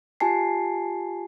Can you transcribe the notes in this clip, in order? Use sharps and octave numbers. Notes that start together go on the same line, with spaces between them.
F4 G4 G#5 A5 C7